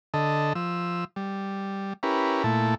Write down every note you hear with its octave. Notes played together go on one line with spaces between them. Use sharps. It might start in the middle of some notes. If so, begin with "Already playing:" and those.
D3 A4 D#5
F3 E6
G3
C#4 E4 G4 A#4 B4
A#2 A3 E4 A5